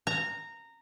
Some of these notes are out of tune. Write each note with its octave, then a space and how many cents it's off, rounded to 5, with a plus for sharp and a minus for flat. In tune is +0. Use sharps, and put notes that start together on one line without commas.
A#5 -15